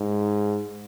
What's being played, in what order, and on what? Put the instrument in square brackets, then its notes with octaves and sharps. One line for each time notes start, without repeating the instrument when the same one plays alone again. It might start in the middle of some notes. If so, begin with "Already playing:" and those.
Already playing: [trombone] G#2